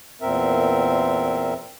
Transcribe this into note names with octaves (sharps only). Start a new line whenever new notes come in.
E2 A#2 C4 A#4 E5